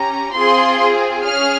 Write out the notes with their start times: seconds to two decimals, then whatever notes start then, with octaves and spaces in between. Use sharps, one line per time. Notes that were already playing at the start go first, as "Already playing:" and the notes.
Already playing: C#4 G4 A#5
0.34 C4 F4 G#4 C6
1.24 C#4 G#4 F6